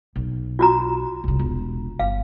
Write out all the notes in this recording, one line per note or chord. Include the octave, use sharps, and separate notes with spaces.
B1
F4 F#4 A#5
C2 C#3
E1
G1 F5